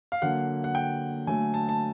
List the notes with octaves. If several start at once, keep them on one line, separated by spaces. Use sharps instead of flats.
F5
D3 F#3 A#3 F#5
F#5
G5
D3 F#3 A3 G#5
A5
A5